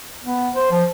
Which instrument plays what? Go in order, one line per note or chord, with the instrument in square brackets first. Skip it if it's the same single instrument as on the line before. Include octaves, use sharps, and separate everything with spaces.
[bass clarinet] B3
C5
F3